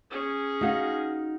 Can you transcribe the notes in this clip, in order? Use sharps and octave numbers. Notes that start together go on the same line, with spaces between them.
C#4 G#4
D#4 F#4 F5